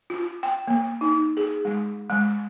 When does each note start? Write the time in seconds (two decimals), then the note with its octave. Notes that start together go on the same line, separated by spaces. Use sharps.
0.10 F4
0.43 G5
0.68 A#3
1.01 D#4
1.37 G#4
1.65 G#3
2.09 G#3